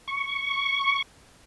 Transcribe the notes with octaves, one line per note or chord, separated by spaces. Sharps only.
C#6